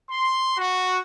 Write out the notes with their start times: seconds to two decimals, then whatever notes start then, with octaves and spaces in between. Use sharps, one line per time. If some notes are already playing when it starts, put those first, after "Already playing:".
0.10 C6
0.58 F#4